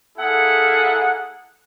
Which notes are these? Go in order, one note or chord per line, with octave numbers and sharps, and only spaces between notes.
A#3 E4 G#4 A4 F#5